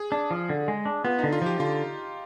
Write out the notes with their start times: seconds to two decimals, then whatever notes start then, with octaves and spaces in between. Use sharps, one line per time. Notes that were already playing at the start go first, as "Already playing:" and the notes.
Already playing: G#4
0.12 D4
0.31 F3
0.50 D3
0.68 G#3
0.85 D4
1.05 B3 F4
1.19 D#4
1.23 D3
1.32 F4
1.42 F3 G4
1.60 D3 F4